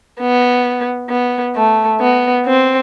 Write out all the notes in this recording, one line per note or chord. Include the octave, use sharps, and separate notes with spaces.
B3
B3
A3
B3
C4